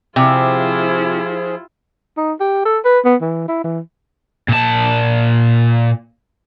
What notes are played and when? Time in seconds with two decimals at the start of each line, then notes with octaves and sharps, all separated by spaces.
0.16 C3 F3 E4 F4 G#4
2.17 D#4
2.40 G4
2.65 A4
2.85 B4
3.05 B3
3.22 E3
3.48 E4
3.64 E3
4.48 A#2 A5